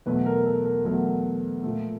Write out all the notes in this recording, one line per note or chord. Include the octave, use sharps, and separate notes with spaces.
E2 B2 F#3 A3 B4
A#4
A4
A#4
E2 B2 F#3 A3 A#4
A#2 F3 A3